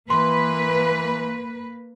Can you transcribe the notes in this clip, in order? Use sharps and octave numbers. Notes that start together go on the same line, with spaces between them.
E3 A#3 B4 C6